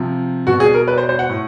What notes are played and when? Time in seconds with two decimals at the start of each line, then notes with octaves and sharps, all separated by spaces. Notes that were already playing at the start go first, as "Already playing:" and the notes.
Already playing: C3 F3
0.47 B2 F#4
0.60 G#4
0.74 A#4
0.88 B4
0.98 C5
1.09 C5
1.19 F#5
1.29 A2